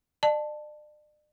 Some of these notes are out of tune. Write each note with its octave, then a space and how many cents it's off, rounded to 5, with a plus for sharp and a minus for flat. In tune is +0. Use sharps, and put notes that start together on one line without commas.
D5 +40 A5 +0